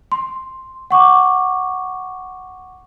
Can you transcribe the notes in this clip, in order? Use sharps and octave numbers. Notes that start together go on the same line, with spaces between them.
C6
F#5 C#6 D6